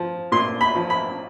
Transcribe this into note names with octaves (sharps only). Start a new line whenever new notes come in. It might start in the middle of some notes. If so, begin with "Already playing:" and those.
Already playing: F3
A#2 C6
B5
F3
B5